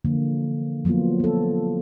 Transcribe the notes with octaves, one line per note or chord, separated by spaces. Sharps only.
D3 E3 F3 A#3
F3 F#3 A#3 B3 F4
B3 A4